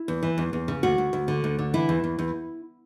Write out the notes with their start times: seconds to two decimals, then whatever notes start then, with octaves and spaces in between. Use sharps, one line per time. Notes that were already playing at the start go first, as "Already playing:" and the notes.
Already playing: E4
0.08 E2
0.23 E3
0.38 E2
0.53 E2
0.68 C#3
0.83 D2 F#4
0.98 D2
1.13 D2
1.28 D3
1.44 D2
1.59 D3
1.74 E3 E4
1.89 E2
2.04 E2
2.19 E2